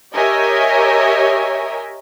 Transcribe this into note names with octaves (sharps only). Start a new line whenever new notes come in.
G4 A#4 C#5 D#5 E5 G#5